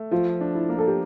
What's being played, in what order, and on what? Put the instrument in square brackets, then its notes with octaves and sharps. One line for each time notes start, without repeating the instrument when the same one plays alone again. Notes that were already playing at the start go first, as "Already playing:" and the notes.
Already playing: [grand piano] A3
[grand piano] F3 [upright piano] F4
[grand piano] D4
[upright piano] E4
[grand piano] A#3
[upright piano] A4
G4